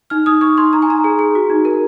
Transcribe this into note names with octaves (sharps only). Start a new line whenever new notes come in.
D#4 F6
D#4 D#6
D#4 C#6
D#4 C6
D#4 A#5
G#5
D#4 A#5
G#4
G#4
F#4
D#4
A#4